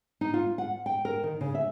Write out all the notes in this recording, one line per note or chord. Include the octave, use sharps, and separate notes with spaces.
D#4
F4
F#5
G5
A#4
D#3
C#3
E5